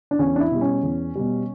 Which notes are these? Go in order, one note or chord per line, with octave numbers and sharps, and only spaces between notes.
D4
E2 C#4
D4
E4
B2 G3
C#4
E2
B2 G3